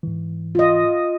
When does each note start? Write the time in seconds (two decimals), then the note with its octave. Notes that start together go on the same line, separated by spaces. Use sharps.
0.03 G#2 E3
0.55 F4 D#5